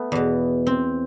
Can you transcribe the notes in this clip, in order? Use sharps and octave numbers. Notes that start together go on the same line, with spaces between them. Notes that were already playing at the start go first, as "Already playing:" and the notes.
Already playing: A3 B3
E2 B2
C4